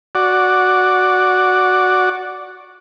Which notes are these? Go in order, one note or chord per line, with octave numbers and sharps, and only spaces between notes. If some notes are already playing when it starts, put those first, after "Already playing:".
F#4 D5